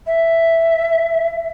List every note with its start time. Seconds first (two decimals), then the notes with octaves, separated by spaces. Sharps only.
0.07 E5